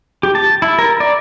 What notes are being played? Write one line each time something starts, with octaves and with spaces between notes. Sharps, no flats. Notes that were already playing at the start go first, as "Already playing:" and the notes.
G4
A5
E4
A#4
D5